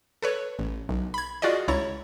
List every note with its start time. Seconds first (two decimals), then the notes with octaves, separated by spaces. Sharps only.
0.22 A4 B4 C#5
0.59 A1
0.89 B1
1.14 B5 G#6
1.42 F4 F#4 G#4 D5 D#5
1.68 C#2 E4 C#5 A#5 A6